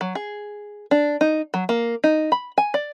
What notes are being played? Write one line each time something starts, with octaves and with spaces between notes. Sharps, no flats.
F#3
G#4
D4
D#4
F#3
A#3
D#4
B5
G#5
D5